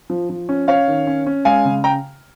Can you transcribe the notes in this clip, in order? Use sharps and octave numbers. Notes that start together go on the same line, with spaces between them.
F3
F3
C#4
C#4 C#5 F5
D#3
C#4
C#4
G#3 F5 G#5
C#3
G5 A#5